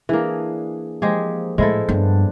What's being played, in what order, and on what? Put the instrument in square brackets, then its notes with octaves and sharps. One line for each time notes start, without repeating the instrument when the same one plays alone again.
[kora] E3 A#3 [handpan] D4 G#4
[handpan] F3 A#3 [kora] G#3 G4 G#4
[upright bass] A2 [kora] G#3 E4 A4 [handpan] C5
[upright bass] G2 [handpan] B3 D4